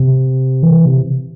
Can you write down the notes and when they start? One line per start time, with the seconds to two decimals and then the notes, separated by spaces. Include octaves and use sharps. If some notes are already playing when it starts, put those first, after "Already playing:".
Already playing: C3
0.63 E3
0.86 C3